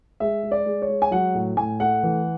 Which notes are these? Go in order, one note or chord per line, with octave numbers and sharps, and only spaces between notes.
G#3 E5
G#3
D5
G#3
C#5
G#3
G#5
F#3 F#5
A2
A2 G#5
A3 F#5
E3